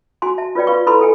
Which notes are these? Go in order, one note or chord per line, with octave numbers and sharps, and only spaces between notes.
F#4 G#5 C6
E5 A5
F4 B4 C#5 D5 G5
F4 B4 F5 C6 C#6
E4 A4 B4 B5 C6
A4 G5 G#5